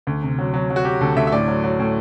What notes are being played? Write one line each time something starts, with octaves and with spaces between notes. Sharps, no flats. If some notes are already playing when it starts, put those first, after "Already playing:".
D2
C3
F#3
F#3
F#3
F#4
F#3 G4
D2 A4
D2 E5
E5
A2 D5
F#3
F#3
A2